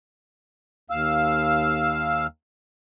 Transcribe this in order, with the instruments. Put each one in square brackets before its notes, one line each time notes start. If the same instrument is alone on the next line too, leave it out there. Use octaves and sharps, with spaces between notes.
[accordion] D#2 F5 E6